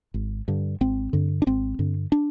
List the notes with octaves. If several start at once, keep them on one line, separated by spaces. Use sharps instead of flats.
G#1
G2 D3
G#1 C4
G2 D3
D4
G#1 C4
G2 D3
D4